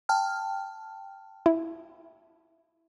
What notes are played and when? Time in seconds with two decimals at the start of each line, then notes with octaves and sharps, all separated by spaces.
0.09 G5 A5 F6
1.46 E4